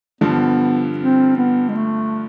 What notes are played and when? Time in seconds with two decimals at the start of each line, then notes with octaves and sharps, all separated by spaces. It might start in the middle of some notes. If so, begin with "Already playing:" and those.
0.21 G2 D3 F3 B3
0.98 C4
1.37 B3
1.69 G#3
1.75 A3